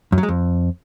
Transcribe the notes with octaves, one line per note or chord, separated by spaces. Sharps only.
F#2
F#3
G#3
F2